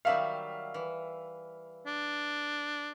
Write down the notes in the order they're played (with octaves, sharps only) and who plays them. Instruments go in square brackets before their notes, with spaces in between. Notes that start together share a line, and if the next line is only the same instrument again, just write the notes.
[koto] D#3 F#3 G3 [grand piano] E5 F5
[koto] E3
[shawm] D4